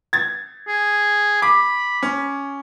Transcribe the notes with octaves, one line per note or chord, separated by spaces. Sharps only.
G#6 A6
G#4
B5 D6
C#4